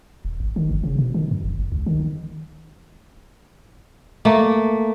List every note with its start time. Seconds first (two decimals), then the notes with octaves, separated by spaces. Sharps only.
0.25 D#1
0.40 G#1
0.56 D#3
0.71 G1
0.84 C#3
0.98 B2
1.14 D#3
1.31 F#2
1.44 F1
1.59 F#1
1.72 C#2
1.87 D#3
4.25 A3 A#3